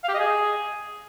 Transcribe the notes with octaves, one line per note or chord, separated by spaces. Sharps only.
F5
G4
D#5
G#4